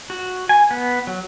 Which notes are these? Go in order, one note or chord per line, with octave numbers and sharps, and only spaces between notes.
F#4
G#5
B3
F#3